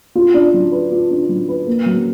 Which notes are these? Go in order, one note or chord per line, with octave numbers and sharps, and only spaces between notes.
F4
D4
F#3
B4
F4
D4
F#3
B4
A#3
F#3